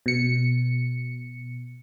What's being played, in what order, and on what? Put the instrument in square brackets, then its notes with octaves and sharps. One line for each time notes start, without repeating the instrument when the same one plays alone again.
[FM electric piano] B2 C#7